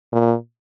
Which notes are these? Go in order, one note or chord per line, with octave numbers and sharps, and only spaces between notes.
A#2